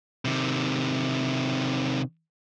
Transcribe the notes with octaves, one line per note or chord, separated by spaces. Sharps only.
C3 D#3